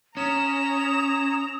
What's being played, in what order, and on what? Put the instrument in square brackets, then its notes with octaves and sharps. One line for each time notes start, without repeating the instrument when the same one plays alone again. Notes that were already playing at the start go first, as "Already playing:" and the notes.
[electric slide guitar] C#4 [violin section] A#5 [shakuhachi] D#6 [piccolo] E7